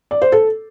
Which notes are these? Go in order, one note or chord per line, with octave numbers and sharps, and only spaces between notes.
D5
C5
A4